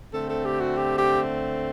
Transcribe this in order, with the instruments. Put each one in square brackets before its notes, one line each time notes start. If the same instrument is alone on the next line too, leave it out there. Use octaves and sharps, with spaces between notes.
[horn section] D3 A3 C4 [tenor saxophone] A4
[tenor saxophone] A4
G4
F#4
G4
G4